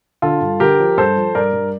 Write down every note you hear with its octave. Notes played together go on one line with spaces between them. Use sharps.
D3 F4 A4
G2
D3 G4 A#4
F3
G2 A4 C5
F3
G2 A#4 D5
G2